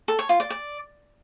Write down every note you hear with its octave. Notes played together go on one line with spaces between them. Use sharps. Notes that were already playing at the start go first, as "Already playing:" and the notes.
A4
C#5
F4
D5
D5